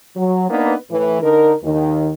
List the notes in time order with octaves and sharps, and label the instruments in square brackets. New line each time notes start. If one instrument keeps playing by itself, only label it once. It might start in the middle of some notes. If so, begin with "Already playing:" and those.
[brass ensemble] F#3
A#3 B3 D4 D#4 B4
A2 E3
D3 D#4 A#4
D#2 D#3